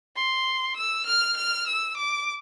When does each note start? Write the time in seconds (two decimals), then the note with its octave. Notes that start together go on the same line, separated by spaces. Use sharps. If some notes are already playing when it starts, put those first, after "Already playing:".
0.16 C6
0.76 E6
1.06 F6
1.37 F6
1.67 E6
1.97 D6